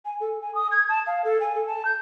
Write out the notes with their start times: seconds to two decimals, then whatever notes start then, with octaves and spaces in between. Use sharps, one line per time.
0.05 G#5
0.20 A4
0.41 G#5
0.55 D#6
0.72 G#6
0.89 A5
1.07 F5
1.24 A4
1.40 G#5
1.55 A4
1.67 A5
1.85 G6